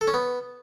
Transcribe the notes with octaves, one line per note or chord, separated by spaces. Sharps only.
A4
C#4
B3